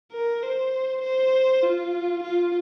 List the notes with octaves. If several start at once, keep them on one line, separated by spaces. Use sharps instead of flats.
A#4
C5
C5
F4
F4